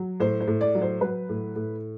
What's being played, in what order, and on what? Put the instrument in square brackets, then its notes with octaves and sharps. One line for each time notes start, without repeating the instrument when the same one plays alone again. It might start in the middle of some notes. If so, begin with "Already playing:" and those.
Already playing: [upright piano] F#3
A2 C5
C5
A2
D5
F#3
C5
F#3 B4
A2
A2